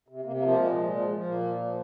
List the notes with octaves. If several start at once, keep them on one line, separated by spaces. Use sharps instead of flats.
C3
C3 A#3
A#3
F3
A#3
A#2 G#3
F3
F3
F3
A#2 A#3
F3
F3